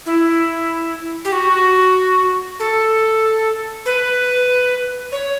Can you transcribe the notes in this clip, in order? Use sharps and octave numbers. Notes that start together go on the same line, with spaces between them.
E4
G4
F#4
A4
B4
C#5